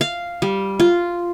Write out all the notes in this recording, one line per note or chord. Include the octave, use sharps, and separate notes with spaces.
F5
G3
F4